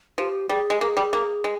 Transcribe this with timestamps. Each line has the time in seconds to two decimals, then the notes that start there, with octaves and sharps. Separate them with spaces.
0.18 F3 G4
0.49 G3 G#4
0.70 G#3
0.81 A#3 G#4
0.97 G3
1.13 A#3
1.44 G#3